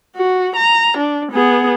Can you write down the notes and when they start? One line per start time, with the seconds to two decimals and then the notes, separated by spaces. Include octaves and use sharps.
0.16 F#4
0.56 A#5
0.97 D4
1.32 B3 G#4